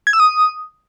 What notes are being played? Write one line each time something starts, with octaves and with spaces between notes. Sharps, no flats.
G#6
E6
D#6